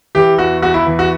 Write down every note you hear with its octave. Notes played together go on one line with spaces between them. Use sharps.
E3 G4
E2 F#4
E2 F#4
E4
E3
F#4